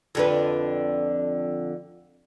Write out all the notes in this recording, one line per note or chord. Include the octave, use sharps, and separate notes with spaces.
F2 D3 B4